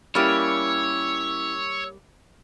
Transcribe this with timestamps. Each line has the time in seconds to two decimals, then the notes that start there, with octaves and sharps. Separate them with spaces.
0.15 G3 A#3 C#4 E4 G4 C#5 E6